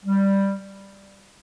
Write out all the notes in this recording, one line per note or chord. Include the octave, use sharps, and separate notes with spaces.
G3